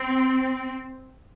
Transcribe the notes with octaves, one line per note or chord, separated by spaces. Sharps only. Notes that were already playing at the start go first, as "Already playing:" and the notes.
Already playing: C4